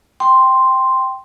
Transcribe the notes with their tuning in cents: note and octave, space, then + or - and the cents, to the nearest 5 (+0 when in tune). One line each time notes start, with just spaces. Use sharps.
G5 +0 C6 +0